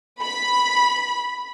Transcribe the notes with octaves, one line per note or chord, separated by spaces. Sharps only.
B5